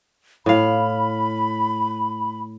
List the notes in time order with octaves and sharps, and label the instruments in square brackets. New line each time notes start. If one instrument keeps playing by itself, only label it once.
[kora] A2 F5 [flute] B5